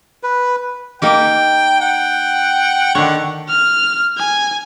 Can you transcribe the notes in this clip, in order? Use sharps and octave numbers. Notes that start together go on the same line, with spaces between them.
B4
A#3 D#4 G4 G5
F#5 G5
D3 D#3 C#5 F#5
F6
G#5